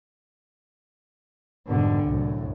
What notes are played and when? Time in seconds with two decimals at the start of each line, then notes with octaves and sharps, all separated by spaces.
1.69 F2 G#2 B2 D3 G3
2.04 C2 F#2 A2